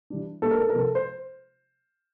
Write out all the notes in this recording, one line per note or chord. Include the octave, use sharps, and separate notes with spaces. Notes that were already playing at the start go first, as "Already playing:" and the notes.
E3 G3 D4
A#2 G3 D4 A4
A#4
A4
A#4
C3 F3 C4 A4
C5